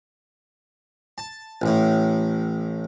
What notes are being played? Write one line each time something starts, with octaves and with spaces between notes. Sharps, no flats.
A5
A1 A2